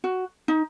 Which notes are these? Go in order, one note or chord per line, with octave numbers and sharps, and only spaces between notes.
F#4
D#4